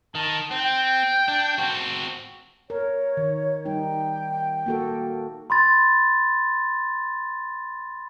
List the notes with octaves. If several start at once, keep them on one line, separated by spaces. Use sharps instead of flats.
D#3 A5
C4 G5
D4
C4 F#4
A#4 C#5
D#3
G3 D#4 G5
A#3 F#4 A4
B5 C6 A6